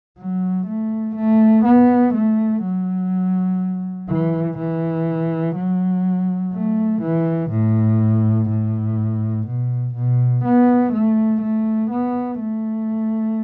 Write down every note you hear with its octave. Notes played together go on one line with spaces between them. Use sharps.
F#3
A3
A3
B3
A3
F#3
E3
E3
F#3
A3
E3
A2
A2
B2
B2
B3
A3
A3
B3
A3